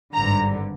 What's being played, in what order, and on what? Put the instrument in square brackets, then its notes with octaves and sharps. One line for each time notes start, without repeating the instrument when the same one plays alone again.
[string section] G#1 G2 D3 A#5